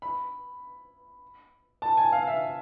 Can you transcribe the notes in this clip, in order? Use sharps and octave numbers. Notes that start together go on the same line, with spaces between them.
B5
A5
G#5
F5
F5
E5